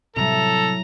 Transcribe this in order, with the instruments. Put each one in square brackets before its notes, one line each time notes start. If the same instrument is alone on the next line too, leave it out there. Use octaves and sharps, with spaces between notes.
[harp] A2 F#3 [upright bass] C3 G3 [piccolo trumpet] A4 [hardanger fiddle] A#5